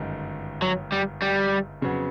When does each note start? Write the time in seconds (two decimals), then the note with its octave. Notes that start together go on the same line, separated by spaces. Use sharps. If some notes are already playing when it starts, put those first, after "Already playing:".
Already playing: G1 F#2 D#3 G#3
0.62 F#3
0.92 G3
1.22 G3
1.81 F2 C#3 F#3 B3